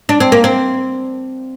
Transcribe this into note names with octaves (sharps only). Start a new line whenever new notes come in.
D4
C4
A#3
C4